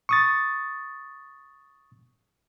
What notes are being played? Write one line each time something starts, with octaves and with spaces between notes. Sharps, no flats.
C#6 D#6 A6